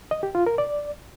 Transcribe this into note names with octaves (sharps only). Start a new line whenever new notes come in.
D#5
G4
F4
A#4
D5